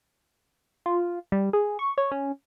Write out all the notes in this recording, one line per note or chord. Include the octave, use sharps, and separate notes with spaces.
F4
G3
G#4
C#6
C#5
C#4